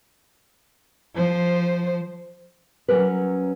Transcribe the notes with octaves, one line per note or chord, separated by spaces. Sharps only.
F3 C5
F#3 C#4 A#4 B4